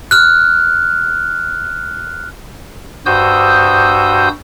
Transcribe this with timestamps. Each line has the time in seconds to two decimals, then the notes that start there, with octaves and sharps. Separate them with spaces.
0.11 F6 F#6
3.06 G2 F#4 C5 D#6 E6 G6